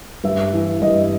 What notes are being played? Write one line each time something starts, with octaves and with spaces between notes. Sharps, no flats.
G2 E5
E3
G2 D#5